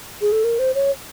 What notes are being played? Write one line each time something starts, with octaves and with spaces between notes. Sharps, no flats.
G#4
A4
A#4
C5
C#5